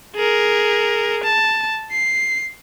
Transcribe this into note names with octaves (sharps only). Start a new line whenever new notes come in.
G#4 A#4
A5
C7